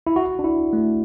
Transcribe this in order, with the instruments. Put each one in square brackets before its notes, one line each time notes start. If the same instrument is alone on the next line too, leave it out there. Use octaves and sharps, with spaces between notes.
[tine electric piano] E4
F#4
D4
E4
A3